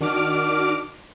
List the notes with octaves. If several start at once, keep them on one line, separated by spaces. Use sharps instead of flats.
D#3 D4 F#4 D6 F6 D7